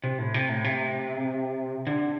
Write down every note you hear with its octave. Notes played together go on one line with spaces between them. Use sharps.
C3
A2
C3
A2
C3
D3